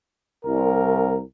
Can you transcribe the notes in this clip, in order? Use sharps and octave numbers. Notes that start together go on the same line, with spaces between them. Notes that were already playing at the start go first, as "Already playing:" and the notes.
C2 A#4